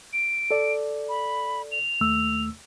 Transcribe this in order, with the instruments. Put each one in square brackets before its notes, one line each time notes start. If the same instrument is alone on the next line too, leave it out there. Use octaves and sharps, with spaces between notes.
[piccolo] D7
[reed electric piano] A4 D5
[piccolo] B5
F7
[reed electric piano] D#2 A3 E6